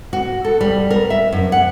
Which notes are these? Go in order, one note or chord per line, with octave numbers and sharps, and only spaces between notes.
F#4
A4
G3
A#4
E5
F#2
F#5